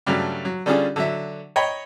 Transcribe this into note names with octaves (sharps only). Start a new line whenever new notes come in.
G2 C#3 F#3 G3 A3
F#3
D3 G3 C#4 D4 F4 G#4
D3 F#3 E5
C#5 D#5 G5 A#5 B5